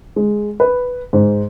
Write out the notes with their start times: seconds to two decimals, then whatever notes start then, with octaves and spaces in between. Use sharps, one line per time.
0.16 G#3
0.60 B4
1.13 G#2